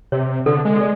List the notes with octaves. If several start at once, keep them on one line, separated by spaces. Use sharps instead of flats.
C3 C#5
D3 A4
G#3
A4 D5